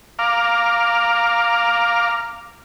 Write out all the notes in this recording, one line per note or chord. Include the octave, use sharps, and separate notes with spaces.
F5 A#5 D6 F6